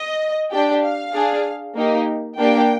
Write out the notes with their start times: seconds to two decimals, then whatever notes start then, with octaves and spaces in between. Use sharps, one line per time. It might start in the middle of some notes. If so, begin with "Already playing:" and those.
Already playing: D#5
0.50 D4 G4 G5
0.83 F5
1.14 D4 G#4
1.75 A#3 D#4 G4
2.38 A#3 D4 G4 G5